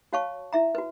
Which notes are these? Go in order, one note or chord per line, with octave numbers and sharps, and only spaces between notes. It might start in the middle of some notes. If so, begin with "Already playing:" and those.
F#4 C#5 F5 A5 C#6
E4 E5 A#5
F#4 B4